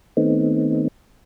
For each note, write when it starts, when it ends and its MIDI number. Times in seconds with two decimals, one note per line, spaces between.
0.17 0.88 51
0.17 0.88 57
0.17 0.88 59
0.17 0.88 60
0.17 0.88 63